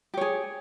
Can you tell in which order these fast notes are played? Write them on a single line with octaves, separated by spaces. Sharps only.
G4 C#5 G#4